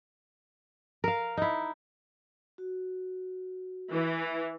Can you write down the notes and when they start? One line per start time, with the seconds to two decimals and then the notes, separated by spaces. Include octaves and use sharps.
1.04 A#4 F5
1.37 D#4 E4
2.58 F#4
3.91 E3